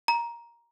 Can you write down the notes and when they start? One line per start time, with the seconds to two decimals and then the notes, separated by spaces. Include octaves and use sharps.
0.08 A#5